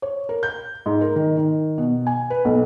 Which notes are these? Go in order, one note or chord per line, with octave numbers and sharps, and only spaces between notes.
C#5
A#4
G6
G#2
A#4
D#3
D#3
B2
G#5
B4
B1